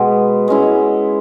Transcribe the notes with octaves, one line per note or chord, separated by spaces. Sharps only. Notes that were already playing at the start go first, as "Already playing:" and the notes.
Already playing: B2 G#3 B3
G#3 C#4 E4